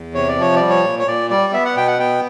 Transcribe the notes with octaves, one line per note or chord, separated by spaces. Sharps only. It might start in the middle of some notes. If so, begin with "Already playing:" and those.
Already playing: E2
C3 C#5
D5
F3 C#5
G3 D5
C#5
A#2
C#5
A#2 D5
G3 D5
B3 E5
F#5
B2 G5
F#5
B3 G5